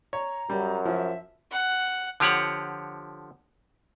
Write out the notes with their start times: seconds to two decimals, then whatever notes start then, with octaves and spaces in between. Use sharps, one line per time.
0.13 C#5 A#5
0.50 F#2 G3
0.85 F3 E5
1.52 F#5
2.20 D3 F3 G4 C#5 F#5